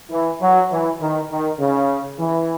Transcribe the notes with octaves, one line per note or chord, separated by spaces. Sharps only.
E3
F#3
E3
D#3
D#3
C#3
E3